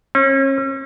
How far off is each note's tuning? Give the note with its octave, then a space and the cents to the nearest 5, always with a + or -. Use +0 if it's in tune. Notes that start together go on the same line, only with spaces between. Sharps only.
C#4 -35